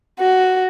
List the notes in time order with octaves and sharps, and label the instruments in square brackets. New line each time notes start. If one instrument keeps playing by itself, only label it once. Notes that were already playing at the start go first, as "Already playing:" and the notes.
[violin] F#4